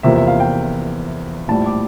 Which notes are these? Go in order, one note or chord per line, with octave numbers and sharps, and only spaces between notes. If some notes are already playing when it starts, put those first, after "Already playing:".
E2 C3 F3 A#3 E5
E5
F5
G5
A#1 A2 G3 A5
D6